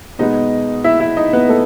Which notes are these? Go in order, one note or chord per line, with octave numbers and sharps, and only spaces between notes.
B2 G#3 B3 D#4 D#5
E4 E5
E4 E5
D#4 D#5
B3 B4
A3 A4